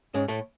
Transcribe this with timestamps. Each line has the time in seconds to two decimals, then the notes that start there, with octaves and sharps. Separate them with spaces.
0.14 G#2 G#3 C#4
0.28 A2 A3